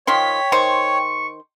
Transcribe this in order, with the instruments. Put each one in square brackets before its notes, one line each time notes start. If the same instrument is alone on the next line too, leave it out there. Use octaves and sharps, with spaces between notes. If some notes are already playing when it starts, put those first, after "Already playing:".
[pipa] D#3 F3 C6 [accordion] C#5 [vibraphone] G5 [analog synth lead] B6
[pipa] D#3 C5 C6 [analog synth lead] C#6